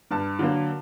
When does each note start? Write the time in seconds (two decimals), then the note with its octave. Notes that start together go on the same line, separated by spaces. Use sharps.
0.11 G2 A5
0.39 D3 F#3 A#3